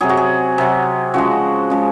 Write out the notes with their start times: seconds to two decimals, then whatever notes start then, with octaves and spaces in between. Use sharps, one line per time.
0.01 C3 F#3 G#4
0.09 F#4
0.17 G#4
0.58 C3 F#3
1.14 C#3 F3 G#3 F#4
1.70 C#3 F3 G#3